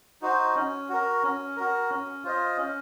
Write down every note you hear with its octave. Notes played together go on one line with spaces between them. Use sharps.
D#4 F#4 C5
C#4
F#4 A#4
C#4
F#4 A#4
C#4
F4 C5 D#5
C#4